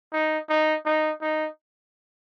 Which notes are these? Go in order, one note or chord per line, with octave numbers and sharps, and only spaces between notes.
D#4
D#4
D#4
D#4